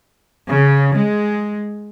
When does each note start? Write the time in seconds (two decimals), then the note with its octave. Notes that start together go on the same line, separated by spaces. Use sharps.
0.49 C#3
0.95 G#3